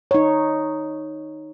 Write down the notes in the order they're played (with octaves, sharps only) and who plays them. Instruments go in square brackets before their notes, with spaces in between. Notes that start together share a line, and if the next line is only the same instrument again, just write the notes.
[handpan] D#4 C#5